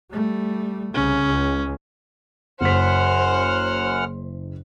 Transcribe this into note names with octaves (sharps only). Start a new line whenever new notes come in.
G3 A3
C2 C#3 C#4
C#2
F#1 F#2 C5 F#5 F6 B6